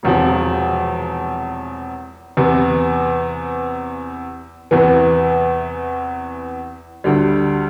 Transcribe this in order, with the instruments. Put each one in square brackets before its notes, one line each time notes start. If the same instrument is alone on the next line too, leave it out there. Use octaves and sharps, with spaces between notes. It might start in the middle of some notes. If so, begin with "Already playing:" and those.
[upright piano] E1 E2 C3 F3
E2 C3 E3 B3
E2 C3 E3 B3 E4
D2 D3 G3